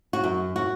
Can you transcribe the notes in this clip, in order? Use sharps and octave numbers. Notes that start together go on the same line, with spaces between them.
F#4
F#2
F#4